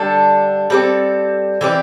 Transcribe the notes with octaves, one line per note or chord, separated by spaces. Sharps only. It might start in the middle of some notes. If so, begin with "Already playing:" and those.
Already playing: D3 G3 D4 A4
G3 C4 A4 D5
E3 C4 G4 D5